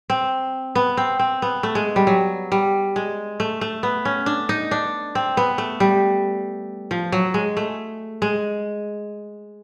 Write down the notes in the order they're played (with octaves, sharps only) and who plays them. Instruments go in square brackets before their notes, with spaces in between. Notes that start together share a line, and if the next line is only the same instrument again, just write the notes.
[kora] C4
B3
C4
C4
B3
A3
G#3
G3
F#3
G3
G#3
A3
A3
B3
C#4
D4
D#4
D4
C4
B3
A3
G3
F3
F#3
G#3
A3
G#3